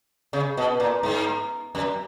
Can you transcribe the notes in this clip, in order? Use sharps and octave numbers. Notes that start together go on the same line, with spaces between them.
C#3
B2
A#2
G#2
F#2